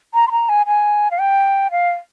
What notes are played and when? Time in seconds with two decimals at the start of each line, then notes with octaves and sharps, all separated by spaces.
0.14 A#5
0.28 C6
0.31 A#5
0.49 G#5
0.66 G#5
1.11 F5
1.19 G5
1.71 F5